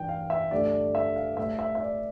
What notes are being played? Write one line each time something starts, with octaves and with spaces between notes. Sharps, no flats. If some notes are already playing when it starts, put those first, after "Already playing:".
Already playing: G2 E3 G3 G5
F5
E5
G2 D3 A3 D5
E5
F5
A2 G3 E5
E5
E5
D5